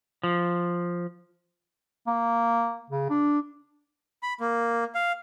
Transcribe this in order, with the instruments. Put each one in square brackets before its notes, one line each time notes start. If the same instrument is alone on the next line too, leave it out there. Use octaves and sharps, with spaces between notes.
[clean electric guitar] F3
[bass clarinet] A#3
C#3
D4
[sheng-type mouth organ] B5
A#3
F5